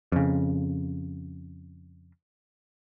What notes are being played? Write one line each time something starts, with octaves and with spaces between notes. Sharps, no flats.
F2 C#3